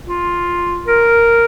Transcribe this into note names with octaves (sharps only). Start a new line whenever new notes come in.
F4
A#4